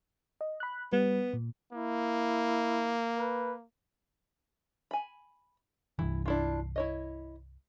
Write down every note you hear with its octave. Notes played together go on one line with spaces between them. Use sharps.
D#5
B5 F#6
G3 B3 B4
A#2
A#3 E4
B4
G#5 B5
C2 G2 E3 E4
D4 E4 F4
E4 C#5 D#5